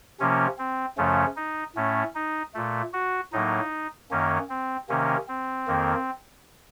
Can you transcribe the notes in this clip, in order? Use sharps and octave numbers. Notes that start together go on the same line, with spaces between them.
C3 F3 A#3 C#4
C4
F#2 C#3 F3 A3 C#4
D#4
A2 A3 C#4
D#4
A#2 A3
F#4
A2 F#3 A#3 D#4
F#2 D#3 A#3 C#4
C4
C3 D#3 A#3 C#4
C4
F2 D#3 A#3